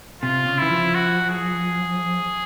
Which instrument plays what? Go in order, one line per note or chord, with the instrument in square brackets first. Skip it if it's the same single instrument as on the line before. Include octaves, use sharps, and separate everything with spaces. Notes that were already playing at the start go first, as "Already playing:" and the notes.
[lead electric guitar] C3 [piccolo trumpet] F4
[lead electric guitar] C#3
[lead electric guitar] E3 [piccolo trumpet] E4
[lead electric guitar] F3
[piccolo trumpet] F#4
G#4